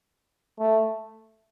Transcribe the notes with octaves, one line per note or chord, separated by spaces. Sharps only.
A3